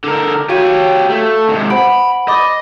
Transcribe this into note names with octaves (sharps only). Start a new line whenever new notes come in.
D3 A#4
F#4 G4 C#5 F5 D#7
A3
G#2 C3
C5 F#5 B5 D7
D#5 B5 D6 A6